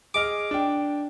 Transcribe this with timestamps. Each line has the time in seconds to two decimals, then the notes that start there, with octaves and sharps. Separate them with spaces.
0.14 G#4 D#5 D6 F6
0.51 D4 G5